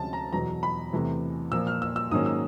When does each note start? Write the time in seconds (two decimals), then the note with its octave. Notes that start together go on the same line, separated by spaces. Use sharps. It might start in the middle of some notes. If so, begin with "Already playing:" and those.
Already playing: D2 C3 F3 G#3 C#4 A5
0.13 A#5
0.33 E2 B2 F#3 A#5
0.63 B5
0.93 E2 C3 E3 A3
1.52 A#2 F3 A#3 E6
1.67 F6
1.82 E6
1.96 E6
2.11 G#2 D#3 F#3 A#3 C#4 D#6
2.26 E6